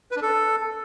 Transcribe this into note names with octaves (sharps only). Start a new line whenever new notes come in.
B4
D4
A4